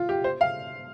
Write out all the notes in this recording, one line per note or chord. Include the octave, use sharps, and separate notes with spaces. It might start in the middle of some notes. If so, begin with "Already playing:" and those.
Already playing: F4
G4
C5
F5